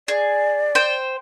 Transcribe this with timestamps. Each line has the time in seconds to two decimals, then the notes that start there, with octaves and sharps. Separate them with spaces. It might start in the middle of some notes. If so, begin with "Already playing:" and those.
0.08 G#4 D5
0.75 C5 G5